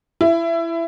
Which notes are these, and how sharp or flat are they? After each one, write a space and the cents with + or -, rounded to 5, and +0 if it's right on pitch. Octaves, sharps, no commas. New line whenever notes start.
E4 +20